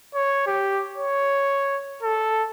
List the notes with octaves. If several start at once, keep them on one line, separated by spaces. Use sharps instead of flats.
C#5
G4
C#5
A4